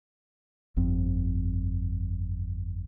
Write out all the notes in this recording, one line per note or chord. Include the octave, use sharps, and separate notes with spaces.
G1 F2 C4